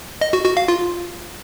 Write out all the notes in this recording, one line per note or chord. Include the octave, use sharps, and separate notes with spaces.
D#5
F#4
F#4
F5
F4